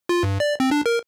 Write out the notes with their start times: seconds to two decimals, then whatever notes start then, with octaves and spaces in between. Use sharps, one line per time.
0.09 F4
0.23 G2
0.40 D5
0.60 C4
0.71 D4
0.86 A#4